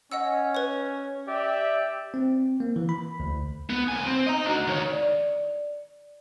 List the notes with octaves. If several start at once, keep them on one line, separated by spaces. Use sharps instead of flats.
C#4 D#5 F#5 E6
B4 C#5
G4 D5 E5
C4
A#3
E3
B5
D2
B3
C2 G#5
C4
D#5 A#5
D4 F#4
D#3 C#5
D5